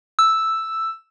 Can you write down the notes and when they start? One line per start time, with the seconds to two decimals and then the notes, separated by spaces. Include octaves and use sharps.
0.19 E6